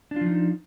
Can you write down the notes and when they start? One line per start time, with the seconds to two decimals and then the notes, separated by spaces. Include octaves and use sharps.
0.11 D4
0.16 F4
0.21 F3
0.26 D#4